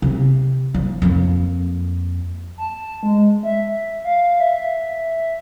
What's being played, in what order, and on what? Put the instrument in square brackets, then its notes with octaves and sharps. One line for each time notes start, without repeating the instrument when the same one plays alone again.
[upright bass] C3
F3
F2 A#3
[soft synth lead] A5
G#3
E5
F5
E5